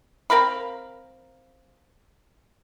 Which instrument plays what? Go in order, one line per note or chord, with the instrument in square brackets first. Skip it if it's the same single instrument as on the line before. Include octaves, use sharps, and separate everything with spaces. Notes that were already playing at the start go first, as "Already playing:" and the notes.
[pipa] C4 A#4 F5 B5